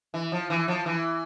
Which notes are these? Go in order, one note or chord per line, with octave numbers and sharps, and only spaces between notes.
E3
F3
E3
F3
E3